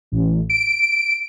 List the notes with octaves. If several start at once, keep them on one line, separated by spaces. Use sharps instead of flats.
A1
D7